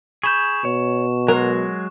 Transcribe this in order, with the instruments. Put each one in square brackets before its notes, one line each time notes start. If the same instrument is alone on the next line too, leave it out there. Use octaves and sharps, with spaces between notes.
[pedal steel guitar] G#4 B5 G6 [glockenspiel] C#6 E7
[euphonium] B2 [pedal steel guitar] C#5
[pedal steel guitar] F#3 G#3 C6 [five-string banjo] A#4